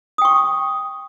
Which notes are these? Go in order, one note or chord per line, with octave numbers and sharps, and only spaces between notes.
G5 C#6 D#6